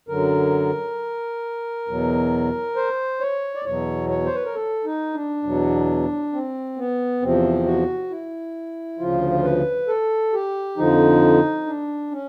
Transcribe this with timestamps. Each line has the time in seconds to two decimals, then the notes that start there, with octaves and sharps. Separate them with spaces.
0.09 F#2 D3 F#3 A#4
1.88 E2 B2 F#3
2.76 C5
3.20 C#5
3.55 D5
3.65 E2 B2 F#3 C#5
4.09 C#5
4.26 C5
4.35 B4
4.45 A#4
4.54 A4
4.84 D#4
5.14 D4
5.43 E2 B2 F#3
6.33 C4
6.77 B3
7.21 E2 C3 F3 C4
7.66 F#4
8.10 E4
8.99 D2 C#3 F3 F4
9.44 B4
9.88 A4
10.33 G4
10.77 F2 D3 F3 D#4
11.66 D4
12.11 C#4